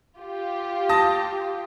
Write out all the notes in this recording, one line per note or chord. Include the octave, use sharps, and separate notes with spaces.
F4 G4
A5 D#6 A#6